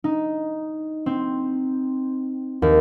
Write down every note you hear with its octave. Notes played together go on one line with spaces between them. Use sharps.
D#4
C4
D#2